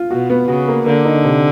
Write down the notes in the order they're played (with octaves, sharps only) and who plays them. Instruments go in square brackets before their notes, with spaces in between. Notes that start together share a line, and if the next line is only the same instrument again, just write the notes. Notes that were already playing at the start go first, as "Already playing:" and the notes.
Already playing: [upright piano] F4
[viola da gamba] B2 [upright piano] F#4
[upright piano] B3
[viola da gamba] C#3 [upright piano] F#4
[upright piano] A#3
[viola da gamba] D3 [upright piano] A#3
[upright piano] D#4
C3